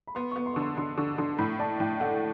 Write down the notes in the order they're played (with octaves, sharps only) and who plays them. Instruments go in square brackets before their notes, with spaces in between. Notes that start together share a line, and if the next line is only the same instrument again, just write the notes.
[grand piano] B5
[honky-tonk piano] B3 [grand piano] C6
[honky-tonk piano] B3 [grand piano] C#6
[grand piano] C6
[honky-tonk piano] D3 [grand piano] C#6
[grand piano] C6
[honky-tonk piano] D3 [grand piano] C6
[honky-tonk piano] D3 [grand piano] C#6
[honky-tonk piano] D3 [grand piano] C6
[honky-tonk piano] A2 [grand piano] B5
[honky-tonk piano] D4 [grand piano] A5
[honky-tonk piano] A2 [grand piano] G5
[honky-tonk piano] A3 [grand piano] F#5